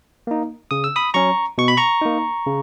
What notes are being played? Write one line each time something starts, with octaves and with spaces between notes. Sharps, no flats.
A#3 D#4
C#3 D#6
E6
B5 D#6
F#3 C#4 A#5 C#6
B2 C#6
B5
A#5 C#6
A#3 D#4
C#3